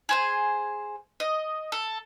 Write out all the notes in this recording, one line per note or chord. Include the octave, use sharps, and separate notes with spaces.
G#4 C5 G#5
D#5
A4